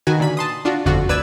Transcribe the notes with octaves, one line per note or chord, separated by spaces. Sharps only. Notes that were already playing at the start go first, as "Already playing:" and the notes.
D#3 F#4 B4 G#5
A#2 D3 B5 B6
A5 C6 D#6
D4 F4 F#4
G1 F2 D3 F4 F#4
D2 B4 D5 E6 G#6